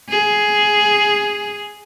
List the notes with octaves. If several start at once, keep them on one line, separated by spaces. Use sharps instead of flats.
G#4